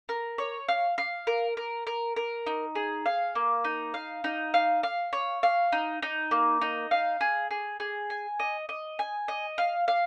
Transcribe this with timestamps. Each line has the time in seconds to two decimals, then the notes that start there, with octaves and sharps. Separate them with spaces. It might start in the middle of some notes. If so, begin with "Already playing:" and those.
0.09 A#4
0.38 C#5
0.68 F5
0.98 F5
1.27 A#4
1.57 A#4
1.87 A#4
2.16 A#4
2.46 D#4
2.75 G#4
3.06 F5
3.35 A#3
3.64 D#4
3.94 F5
4.24 D#4
4.54 F5
4.83 F5
5.13 C#5
5.43 F5
5.72 D#4
6.02 D#4
6.31 A#3
6.62 D#4
6.91 F5
7.21 G#4
7.51 G#4
7.80 G#4
8.10 G#5
8.39 D#5
8.69 D#5
8.99 G#5
9.28 D#5
9.58 F5
9.88 F5